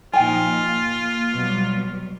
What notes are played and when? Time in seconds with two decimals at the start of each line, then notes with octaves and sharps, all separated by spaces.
0.13 A#2 F3 D#4 F4 G5 G#5
0.70 A#3
1.32 B2 F#3 G3